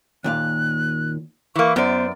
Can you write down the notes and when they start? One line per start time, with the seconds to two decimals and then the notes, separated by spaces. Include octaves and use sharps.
0.24 D#2 A#2 F5 F#6
1.56 E3 A#3 C#6
1.76 F#2 B3 C5 D5